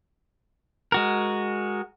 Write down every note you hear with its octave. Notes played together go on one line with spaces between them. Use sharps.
G#3 F#4 A#4